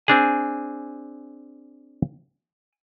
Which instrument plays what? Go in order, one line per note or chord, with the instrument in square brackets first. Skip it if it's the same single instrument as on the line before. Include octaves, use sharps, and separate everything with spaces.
[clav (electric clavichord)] C4 D4 G#4 [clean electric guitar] G#5